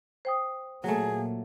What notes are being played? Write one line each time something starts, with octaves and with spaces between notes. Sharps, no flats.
C5 G5 D#6
A#2 F#3 A3 A#3 G#4